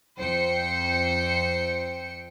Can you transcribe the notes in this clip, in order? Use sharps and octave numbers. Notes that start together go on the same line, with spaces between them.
F2 C5 G5 C#7